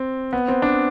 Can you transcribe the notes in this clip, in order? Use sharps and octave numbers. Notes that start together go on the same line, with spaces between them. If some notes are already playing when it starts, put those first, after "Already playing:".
Already playing: C4
B3
C4
D4